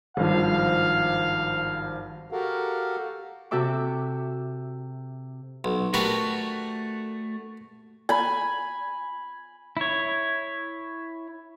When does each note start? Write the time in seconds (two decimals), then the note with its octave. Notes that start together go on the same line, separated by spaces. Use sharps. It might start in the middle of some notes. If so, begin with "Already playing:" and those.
0.17 G#1 G2 F3 F5
2.32 F#4 G4 A4 A#4 F5 F#5
3.51 C3 F#4 A4 E5 D6
5.64 B1
5.94 A3 F#4 G4 A#4 B4
8.09 G#5 B5
9.77 E4 C#5